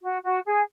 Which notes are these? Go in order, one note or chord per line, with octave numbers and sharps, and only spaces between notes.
F#4
F#4
G#4